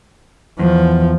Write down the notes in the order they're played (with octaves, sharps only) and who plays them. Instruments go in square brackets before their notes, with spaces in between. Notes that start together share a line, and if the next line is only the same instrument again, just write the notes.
[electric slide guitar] E2 [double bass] F3